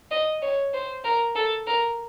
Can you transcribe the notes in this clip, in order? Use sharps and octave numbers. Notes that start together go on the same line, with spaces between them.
D#5
C#5
C5
A#4
A4
A#4